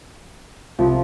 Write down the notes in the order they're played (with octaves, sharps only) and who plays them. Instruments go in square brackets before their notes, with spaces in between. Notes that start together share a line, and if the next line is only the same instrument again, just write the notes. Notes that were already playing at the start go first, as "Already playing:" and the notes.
[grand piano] C2 [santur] F3